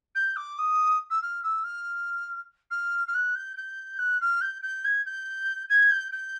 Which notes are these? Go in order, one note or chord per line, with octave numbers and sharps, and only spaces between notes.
G6
D6
D#6
E6
F6
E6
F6
F6
F6
F#6
G6
G6
F#6
F6
G6
G6
G#6
G6
G#6
G6
G6